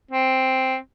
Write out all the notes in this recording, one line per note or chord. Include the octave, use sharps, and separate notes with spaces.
C4